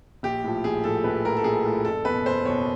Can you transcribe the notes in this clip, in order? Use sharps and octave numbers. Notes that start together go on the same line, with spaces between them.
A#1 G4
A2 F3
A#1 G#4
A2 F3 A4
A#1 B4
A2 F3 A#4
A4
A#1 G#4
A2 F3 A4
F#1 A4
E2 B4
B2
F#1 C5
E2 B2 C#5